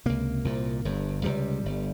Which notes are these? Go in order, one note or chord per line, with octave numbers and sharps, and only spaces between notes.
C#2 C3 A#3
C2 A#2
G1 G2
C#2 C3 G3
G1 G2